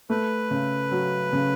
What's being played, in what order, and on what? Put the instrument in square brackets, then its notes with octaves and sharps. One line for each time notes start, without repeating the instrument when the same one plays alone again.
[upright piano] A3 [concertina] B4
[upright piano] C#3
F#3
C#3